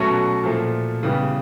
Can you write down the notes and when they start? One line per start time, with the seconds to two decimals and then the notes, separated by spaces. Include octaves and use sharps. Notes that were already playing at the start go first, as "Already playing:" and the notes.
Already playing: B2 F#3 A3 C#4 F#4
0.43 A#2 F3 A3
1.03 C#3 E3 G3 B3